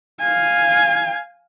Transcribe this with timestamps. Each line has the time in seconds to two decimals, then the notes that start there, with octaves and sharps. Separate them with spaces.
0.20 F5 G#5